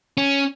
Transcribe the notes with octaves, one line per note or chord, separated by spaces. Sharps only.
C#4